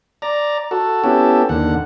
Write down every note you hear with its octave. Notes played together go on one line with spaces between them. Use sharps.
D5 A#5
F#4 A4
B3 C#4 E4 G4 A4
D#2 D3 F#5